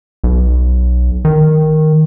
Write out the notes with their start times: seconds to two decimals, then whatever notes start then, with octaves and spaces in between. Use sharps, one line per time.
0.24 B1
1.25 D#3